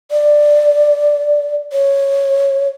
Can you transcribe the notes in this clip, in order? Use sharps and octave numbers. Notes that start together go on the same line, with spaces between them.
D5
C#5